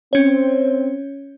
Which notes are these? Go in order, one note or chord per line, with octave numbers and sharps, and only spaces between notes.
C4 C#4 C#5